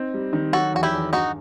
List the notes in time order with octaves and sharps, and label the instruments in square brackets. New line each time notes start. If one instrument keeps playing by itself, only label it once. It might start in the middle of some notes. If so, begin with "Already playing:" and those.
Already playing: [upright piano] C4 D#4
G3
D#3
[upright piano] F#3 [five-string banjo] F#4 A4
[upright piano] E2 [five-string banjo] F#4
[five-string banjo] E4 G4
[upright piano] E2
[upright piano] G2 [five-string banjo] D#4 F#4